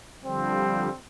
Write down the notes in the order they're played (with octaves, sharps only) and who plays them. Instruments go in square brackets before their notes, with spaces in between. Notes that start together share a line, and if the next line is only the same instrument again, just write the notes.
[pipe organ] D3 F3 G3 [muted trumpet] C4